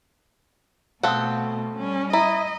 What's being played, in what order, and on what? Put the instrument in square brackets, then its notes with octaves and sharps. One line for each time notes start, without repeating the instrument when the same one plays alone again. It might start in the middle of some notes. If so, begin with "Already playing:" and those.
[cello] B2 A3 [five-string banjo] C4 A4 F#5 [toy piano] F5 D#6
[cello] G3 C#4
[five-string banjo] E4 [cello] D#5 [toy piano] A#5